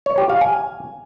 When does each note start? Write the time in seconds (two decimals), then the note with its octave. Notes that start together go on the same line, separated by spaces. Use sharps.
0.06 C#5
0.18 G4
0.29 F5
0.41 G#5